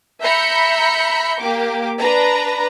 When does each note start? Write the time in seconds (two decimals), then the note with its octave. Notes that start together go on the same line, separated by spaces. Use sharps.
0.22 E5 A#5 B5 G6 B6 C#7
1.41 A#3 G4 D6
2.00 D4 B4 A#5